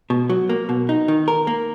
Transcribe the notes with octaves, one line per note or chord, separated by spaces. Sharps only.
B2
F#3
A#3
B2
D#4
D#3
A#4
A#3